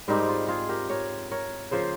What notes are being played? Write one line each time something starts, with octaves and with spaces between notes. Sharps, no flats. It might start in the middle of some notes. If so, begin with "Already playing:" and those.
G#2 G3 C4 D#4 G4 A#4
F4
F4 G#4
G4 A#4
A#4 C#5
A#4 C#5
C#3 F3 A#3 G#4 C5